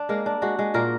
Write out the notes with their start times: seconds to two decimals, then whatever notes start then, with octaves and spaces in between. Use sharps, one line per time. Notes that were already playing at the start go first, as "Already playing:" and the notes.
Already playing: D4
0.09 G#3 A#3 A#4
0.26 D4
0.42 G#3 F#4
0.59 G#3
0.74 A#2 A#3 A#4